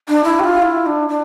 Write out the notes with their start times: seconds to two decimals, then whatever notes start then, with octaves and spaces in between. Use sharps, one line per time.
0.08 D4
0.24 E4
0.40 G4
0.44 F4
0.62 E4
0.86 D4
1.09 D4